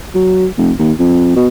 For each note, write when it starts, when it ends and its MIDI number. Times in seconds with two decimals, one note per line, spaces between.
0.15 0.46 54
0.58 0.72 29
0.79 0.92 39
0.99 1.33 41
1.36 1.47 47